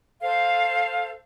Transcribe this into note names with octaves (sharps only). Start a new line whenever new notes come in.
A4 C5 F5